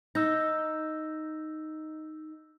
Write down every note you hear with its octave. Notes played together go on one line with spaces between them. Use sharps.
D#4 E6 G6 A#6